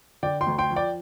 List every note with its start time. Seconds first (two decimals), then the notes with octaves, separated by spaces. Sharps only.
0.23 D3 D5 G5
0.41 G5 C6
0.47 D2
0.58 G5 C6
0.71 F3
0.76 D5 G5